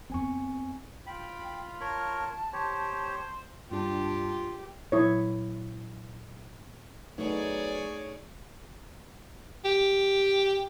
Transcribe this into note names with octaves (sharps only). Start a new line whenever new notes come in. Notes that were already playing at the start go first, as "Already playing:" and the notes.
F2 B3 C4 G#5 C#6
F4 G5 B5
A#4 C#5 A5
G4 C5 C#5
G2 D4 F4 G4 A5
A#2 F#3 E4 C#5 D#6
F#2 A3 B3 D#4 G#4 C#5 D5
G4